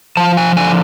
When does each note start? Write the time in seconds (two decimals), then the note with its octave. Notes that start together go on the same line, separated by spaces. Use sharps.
0.17 F3 A5
0.37 G#5
0.56 D3 G#5